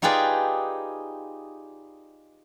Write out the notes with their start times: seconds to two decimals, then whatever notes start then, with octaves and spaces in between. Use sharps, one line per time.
0.02 D#4 F4 G4 G#4 B4 D5